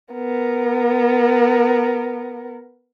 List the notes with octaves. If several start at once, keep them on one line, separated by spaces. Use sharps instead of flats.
B3 A#4